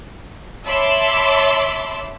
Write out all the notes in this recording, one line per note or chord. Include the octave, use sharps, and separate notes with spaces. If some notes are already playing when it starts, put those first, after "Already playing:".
C#5 E5 A5 B5 C6 D6